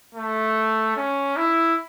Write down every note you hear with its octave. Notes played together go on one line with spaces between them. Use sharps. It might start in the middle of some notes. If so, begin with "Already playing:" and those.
A3
C#4
E4